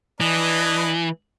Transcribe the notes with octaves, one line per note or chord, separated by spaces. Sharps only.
E3 D4 B4 D#5